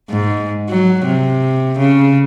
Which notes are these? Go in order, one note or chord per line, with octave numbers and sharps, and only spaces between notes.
G#2
F#3
C3
C#3